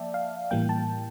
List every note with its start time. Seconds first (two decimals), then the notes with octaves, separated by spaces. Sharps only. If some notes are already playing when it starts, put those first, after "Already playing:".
Already playing: F3 A#3 D5 E5 G5 A5
0.14 F5
0.51 A2 E3 G3 A#3 G5
0.69 A5